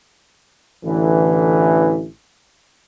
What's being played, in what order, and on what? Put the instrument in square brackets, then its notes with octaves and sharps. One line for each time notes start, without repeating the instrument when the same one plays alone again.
[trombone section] A1 D3 E3